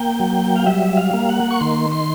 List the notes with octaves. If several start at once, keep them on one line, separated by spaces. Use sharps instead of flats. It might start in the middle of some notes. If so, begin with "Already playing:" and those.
Already playing: A#3 G5
F#3
F5
G3 E5
F5
A#3
F#5
C#6
D#3 C6
C6